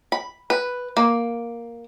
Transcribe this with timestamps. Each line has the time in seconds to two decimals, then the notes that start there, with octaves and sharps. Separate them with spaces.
0.12 B5
0.50 B4
0.97 A#3